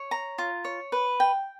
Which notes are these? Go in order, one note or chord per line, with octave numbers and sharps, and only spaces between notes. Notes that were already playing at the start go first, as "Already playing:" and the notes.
Already playing: C#5
A#5
F4
C#5
B4
G5